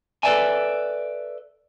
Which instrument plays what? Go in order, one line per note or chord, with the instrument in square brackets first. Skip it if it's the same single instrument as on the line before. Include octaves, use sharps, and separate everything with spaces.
[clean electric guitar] A4 B4 C#5 D5 E5 G#5